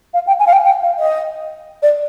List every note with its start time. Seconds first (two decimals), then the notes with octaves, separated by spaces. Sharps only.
0.14 F5
0.27 G5
0.40 G#5
0.47 F5
0.53 G5
0.65 G5
0.82 F5
0.99 D#5
1.83 D5